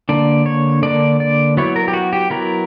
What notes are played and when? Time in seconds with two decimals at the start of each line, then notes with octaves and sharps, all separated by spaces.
0.09 D3 A#3 D4 D5
0.46 C#5
0.83 D3 A#3 D4 D5
1.20 D5
1.57 F#3 B3 E4 C#5
1.76 A#4
1.88 G4
1.93 F#4
2.13 G4
2.30 F#3 B3 E4 A#4